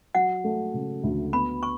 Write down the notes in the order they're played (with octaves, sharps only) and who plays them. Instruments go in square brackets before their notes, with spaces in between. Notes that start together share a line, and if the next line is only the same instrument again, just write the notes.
[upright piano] F#3 [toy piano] F#5
[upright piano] A3
C#3
D2
[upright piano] B3 [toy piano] B5
[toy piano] C#6